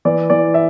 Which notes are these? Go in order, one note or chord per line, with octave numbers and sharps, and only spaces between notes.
E3 D5
E3 D5
E5